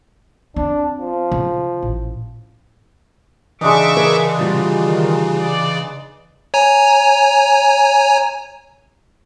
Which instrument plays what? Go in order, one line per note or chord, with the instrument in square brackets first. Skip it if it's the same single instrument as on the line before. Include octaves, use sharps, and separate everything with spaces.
[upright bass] C4 [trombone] D4
[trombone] F3
[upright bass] C#3
A1
[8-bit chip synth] C#3 E3 [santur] G#3 D4 D#4 [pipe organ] E5 C#6 D6
[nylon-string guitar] G#4 A#4 B4
[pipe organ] C3 [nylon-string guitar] G3 F4 F#4
[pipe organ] D#3
D5
[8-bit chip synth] C#5 G#5 A#5